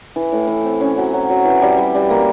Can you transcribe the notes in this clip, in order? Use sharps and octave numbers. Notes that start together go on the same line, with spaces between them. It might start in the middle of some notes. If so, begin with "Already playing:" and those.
E3
A2
E3
C4
C#4
F#3
F#3
F#3
E3
G3
G3
G3
A#3